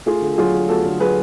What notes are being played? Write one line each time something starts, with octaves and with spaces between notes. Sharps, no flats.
A3 F4 G#4
D3
A4
F#3 F4 G#4
D3
A3 F#4 A4
D3
F#3 G#4 B4